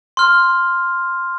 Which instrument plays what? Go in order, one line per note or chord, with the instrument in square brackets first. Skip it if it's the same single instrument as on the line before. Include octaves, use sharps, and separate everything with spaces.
[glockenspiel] C6 F6